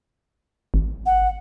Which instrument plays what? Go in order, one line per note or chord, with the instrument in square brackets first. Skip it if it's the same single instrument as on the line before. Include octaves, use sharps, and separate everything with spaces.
[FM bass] G#1
[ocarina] F#5